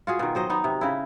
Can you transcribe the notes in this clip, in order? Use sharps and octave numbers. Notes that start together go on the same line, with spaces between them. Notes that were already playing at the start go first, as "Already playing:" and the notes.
F4 F#4 G#4
B2 D#3
F#3 C5 D#5
B3 D#4
C3
C#3 E4